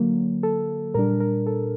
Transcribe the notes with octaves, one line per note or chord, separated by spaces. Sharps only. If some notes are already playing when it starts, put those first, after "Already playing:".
Already playing: D3 F#3 A#3
A4
A#2 G3 D4 A#4
A#4
A4